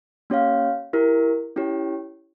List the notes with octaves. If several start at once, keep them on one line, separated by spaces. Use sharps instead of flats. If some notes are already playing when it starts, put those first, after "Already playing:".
A#3 C#4 G4 C#5 F5
E4 G4 A#4
C#4 E4 G4 C#5